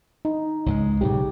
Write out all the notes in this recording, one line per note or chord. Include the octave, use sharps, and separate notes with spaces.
D#4
C#2 G#2 G#3
B1 G#2 C#3 G4